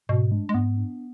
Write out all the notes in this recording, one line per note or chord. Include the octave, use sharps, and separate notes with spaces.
G#2 B2
G#3 D4
G#3
G#2 B3
D4